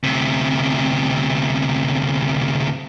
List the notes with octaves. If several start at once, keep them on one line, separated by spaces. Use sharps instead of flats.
D2 C3